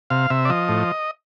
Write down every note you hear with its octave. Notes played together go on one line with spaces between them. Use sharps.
C3 F5
C3 E5
D5
F3 D#5
A2